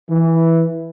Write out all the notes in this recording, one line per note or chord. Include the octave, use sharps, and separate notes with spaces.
E3